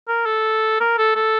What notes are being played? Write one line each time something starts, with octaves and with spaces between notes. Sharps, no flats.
A#4
A4
A#4
A4
A4